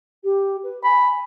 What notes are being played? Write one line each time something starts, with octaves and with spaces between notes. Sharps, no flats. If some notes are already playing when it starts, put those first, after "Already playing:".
G4
B4
G#5 B5